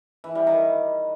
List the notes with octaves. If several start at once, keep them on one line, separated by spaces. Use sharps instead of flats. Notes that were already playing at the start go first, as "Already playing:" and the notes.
E3
G3
D#3